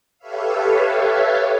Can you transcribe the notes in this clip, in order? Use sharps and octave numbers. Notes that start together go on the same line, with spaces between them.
G4 A4 B4 C#5 E5 F5